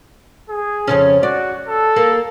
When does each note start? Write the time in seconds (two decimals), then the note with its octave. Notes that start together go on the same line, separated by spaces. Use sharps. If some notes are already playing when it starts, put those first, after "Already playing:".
0.49 G#4
0.88 F2 C#3 C#4
1.23 F#4 D5
1.67 A4
1.96 A#3